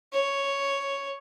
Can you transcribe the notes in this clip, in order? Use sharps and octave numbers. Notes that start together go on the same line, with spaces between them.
C#5